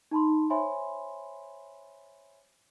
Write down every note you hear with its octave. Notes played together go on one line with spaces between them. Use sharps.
D#4 A5 B5 C6
C5 C#5 E5 G#5 B5 C6